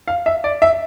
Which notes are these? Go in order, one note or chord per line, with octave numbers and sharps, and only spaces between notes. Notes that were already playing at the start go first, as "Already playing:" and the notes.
F5
E5
D5
E5